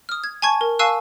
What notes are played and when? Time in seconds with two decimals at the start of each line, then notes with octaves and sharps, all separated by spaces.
0.09 D#6 F6
0.24 G#6
0.42 G#5 A5 C#6 G#6
0.61 A#4
0.79 F5 G#5 A5 C#6 E6 F#6